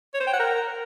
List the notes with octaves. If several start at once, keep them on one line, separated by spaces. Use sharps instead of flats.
C#5
C5
G5
F#5
A#4